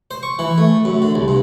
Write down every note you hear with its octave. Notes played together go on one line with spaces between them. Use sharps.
C5
C#6
E3
A3
F#2
D3
C2
G2